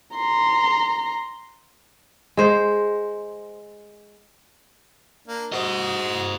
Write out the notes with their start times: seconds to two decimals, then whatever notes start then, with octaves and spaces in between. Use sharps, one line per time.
0.16 A#5 C6
2.37 G#3 C5
5.28 A#3 D4
5.52 F#4 C5 D#5 D#6